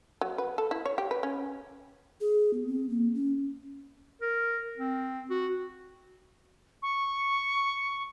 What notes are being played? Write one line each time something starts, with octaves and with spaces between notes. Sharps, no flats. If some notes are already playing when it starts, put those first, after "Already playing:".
F#3
B4
A4
E4
C#5
G4
B4
C#4
G#4
B3
C4
A#3
C#4
A#4
C4
F#4
C#6